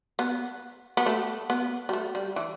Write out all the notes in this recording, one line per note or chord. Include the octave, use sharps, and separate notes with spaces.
B3
B3
A3
B3
G3
A3
G3
E3